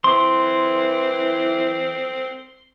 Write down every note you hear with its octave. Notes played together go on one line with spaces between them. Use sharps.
E3 C4 C6